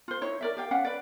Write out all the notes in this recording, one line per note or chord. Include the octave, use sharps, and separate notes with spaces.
F4 C5
D#4 E4 C#5
A#4 D5 E5
G4 F5 G5
C#4 F5 F#5
B4 D5